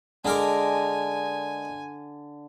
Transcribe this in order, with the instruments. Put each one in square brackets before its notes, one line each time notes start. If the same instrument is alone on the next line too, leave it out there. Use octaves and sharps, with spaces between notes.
[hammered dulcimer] D3 [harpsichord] G#3 A#4 D6 [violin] G#5